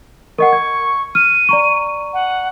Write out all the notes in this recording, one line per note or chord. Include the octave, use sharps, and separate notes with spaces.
A#4 D#5 F#5 C#6
G#6
F6 D#7
D5 A#5 C#6
F#5